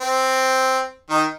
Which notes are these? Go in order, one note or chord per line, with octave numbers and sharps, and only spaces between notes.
C4
D#3 D#4